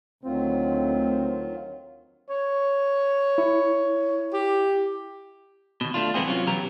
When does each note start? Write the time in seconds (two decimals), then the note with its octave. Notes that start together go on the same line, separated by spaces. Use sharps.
0.24 D2 D#3 F#3 C4 F4
2.29 C#5
3.38 E4
4.33 G4
5.81 D#2 B2
5.94 A3 D4 F4
6.14 C2 G#2 E3 B3 C4 G#4
6.26 C3 F#3 C#4 F4
6.46 B2 E3 F#3 B3 G4 A#5